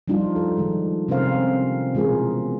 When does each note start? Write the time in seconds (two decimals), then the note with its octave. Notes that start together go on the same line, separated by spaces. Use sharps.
0.08 F3 G3 D4 D#4 F4
0.36 A4
0.57 D#3 F3 G#3
1.08 C3 C4 C#4 A#4 C5 F5
1.95 B2 E3 G#3 F4 G#4 A#4